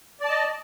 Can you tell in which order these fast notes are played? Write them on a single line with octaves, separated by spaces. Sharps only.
D5 A5 D#5